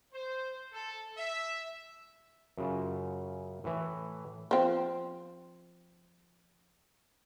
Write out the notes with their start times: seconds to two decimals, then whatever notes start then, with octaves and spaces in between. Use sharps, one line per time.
0.13 C5
0.73 A4
1.18 E5
2.58 F#2 C#3 F4
3.64 A2 E3
4.51 F3 C4